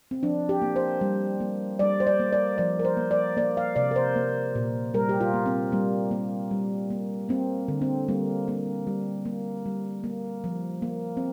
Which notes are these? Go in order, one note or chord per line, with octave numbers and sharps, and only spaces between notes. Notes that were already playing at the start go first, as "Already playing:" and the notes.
C4
F3 D4
G4
A#3
C5
G3
A#3
G3 D5
C5
D5
A#3
D5
F3 D5
A#4
C5
A#3
D5
A#3 D5
F5
C3 D5
A#4
C5
A#3
A#2
G3 A#4
G4
F4
A#3
C4
G3 A#3
A#3
G3
A#3
A#3 C4
D3
C4
G3 A#3
A#3
G3
A#3
G3
A#3
F3
A#3
C4